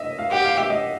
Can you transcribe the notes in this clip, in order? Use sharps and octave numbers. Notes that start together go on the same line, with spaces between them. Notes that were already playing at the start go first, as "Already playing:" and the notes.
Already playing: D#5 E5
F5
G4 F#5
F5
E5
D#5